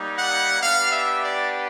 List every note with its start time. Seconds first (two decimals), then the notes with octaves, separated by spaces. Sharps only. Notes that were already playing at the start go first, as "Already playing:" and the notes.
Already playing: G3 A#3 D#4
0.16 F#5
0.61 B3 D4 G4 F5
0.91 E5
1.22 D5